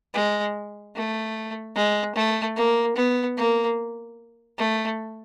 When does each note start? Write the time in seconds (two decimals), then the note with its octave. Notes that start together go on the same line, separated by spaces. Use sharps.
0.14 G#3
0.95 A3
1.75 G#3
2.15 A3
2.57 A#3
2.96 B3
3.37 A#3
4.58 A3